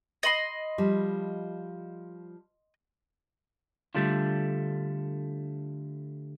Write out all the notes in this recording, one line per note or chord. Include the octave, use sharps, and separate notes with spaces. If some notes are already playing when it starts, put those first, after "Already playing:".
D#5 B5 C6
F3 G3
D3 G3 A3 D4 F4